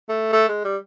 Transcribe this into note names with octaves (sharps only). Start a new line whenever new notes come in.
A3
A3
G#3
G3